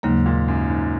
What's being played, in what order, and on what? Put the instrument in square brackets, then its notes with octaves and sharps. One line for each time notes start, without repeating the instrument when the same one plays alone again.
[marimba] D#2 C#3 F#3 A#3 [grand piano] G#2
[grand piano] A#2
F#2
G#2